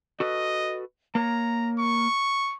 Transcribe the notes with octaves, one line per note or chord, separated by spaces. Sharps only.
F#4 A4 B4 D#5
A#3 A#4 C#5 A#5
C#6